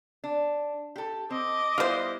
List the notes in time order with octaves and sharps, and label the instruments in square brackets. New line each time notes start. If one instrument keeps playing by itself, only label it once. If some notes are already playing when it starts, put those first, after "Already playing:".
[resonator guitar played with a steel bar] D4
G4 A4
[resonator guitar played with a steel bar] C4 [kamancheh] D#5 D6
[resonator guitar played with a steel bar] G3 B3 E4 [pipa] F4 C5